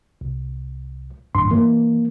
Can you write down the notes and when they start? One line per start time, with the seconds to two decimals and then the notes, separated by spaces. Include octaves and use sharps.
0.21 C2
1.35 D1 G2 C6
1.51 E3 A#3